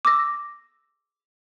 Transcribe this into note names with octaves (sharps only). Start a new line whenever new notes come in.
D6 E6 A#6